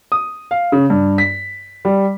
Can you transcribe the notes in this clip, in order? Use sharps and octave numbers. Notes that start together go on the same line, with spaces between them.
D#6
F5
C#3
G2
B6
G3